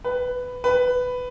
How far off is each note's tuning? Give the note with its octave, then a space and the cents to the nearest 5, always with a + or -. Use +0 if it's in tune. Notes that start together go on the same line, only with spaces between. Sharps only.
B4 +10
B4 +10